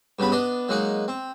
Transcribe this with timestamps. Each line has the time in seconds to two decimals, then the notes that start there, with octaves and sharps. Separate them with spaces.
0.19 G2 C#3 B3 B5
0.32 B3 D4 D5 D#5
0.69 F#3 G#3 A#3 D#4 F#5
1.08 C4